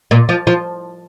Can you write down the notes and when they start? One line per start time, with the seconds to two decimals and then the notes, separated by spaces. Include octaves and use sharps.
0.11 A#2
0.29 F3
0.47 F3